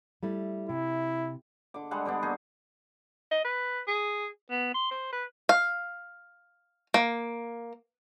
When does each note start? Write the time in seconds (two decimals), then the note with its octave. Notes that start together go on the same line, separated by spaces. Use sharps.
0.23 G3 A3 E4
0.69 C3 E4
1.74 D3 D6
1.91 G3 G#3 A4 F#5
2.05 D3 G3 B3 D4
2.22 A#3 D#4 F#4 G#4
3.31 D#5
3.45 B4
3.88 G#4
4.50 B3
4.74 C6
4.91 C5
5.13 B4
5.49 F5
6.94 A#3